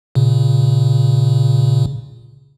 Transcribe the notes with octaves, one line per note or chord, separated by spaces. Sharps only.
A#2 C#3